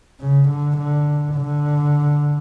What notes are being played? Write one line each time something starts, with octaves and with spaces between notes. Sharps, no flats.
C#3
D3
D3
D3